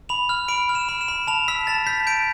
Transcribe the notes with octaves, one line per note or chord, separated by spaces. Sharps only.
B5 F7
F6
B5 D7
F6
E7
B5
E7
B5
A5 F7
E6 B6
A5 A6
G6 B6
G6 D7